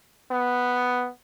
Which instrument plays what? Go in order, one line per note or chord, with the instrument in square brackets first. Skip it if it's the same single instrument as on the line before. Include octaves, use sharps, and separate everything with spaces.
[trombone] B3